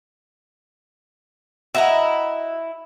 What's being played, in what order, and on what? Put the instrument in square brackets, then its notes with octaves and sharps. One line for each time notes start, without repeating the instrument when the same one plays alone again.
[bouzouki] E4 [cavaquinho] F#4 D#5 A#5